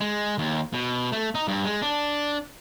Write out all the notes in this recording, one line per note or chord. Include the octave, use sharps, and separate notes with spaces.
G#3
D#2
B2
A3
D#4
G2
G#3
D4